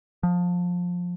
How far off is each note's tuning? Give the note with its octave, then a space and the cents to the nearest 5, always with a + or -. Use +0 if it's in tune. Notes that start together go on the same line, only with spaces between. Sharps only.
F3 +20